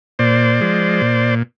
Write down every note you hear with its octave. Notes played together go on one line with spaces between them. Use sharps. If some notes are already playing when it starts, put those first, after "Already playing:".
A#2 C5 D5
F3 G#3
A#2